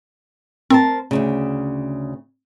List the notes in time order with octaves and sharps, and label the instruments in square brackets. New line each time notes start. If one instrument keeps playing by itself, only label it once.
[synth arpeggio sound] C4 [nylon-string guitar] A#4 C5 A5
[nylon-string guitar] D2 A#2 C#3